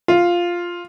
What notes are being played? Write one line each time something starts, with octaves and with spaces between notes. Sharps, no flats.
F4